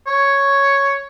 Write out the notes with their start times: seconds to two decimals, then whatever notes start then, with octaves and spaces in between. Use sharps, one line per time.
0.07 C#5